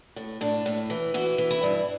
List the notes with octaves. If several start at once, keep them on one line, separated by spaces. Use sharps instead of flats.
A2
A2 D4
A2
E3
E3 F#4
E3
E4
G2